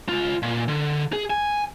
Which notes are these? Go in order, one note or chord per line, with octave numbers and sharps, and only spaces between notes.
C#2 F4
A#2
D3
G#4
G#5